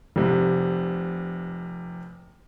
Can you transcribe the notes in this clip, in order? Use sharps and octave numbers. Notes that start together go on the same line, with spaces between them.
F1 C3